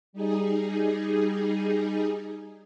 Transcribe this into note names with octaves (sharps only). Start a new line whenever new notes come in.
G3 D#4 G#4